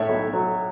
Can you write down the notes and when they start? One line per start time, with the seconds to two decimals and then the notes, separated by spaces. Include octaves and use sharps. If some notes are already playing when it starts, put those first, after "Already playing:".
Already playing: A2 C#5 E5
0.09 B1
0.33 F#3